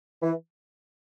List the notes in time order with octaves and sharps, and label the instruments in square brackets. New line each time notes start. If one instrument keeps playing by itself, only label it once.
[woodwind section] E3